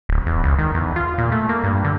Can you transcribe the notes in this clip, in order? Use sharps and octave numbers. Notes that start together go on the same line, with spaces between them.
D1
E2
C#2
D#3
E2
F4
A#2
A3
A#3
G2
D3